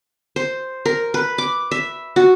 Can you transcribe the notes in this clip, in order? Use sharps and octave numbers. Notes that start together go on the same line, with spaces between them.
C5
A#4
B4
D6
E5
F#4